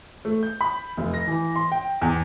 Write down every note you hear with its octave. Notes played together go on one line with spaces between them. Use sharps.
A3
G6
B5
F1
A#6
E3
C6
G5
E2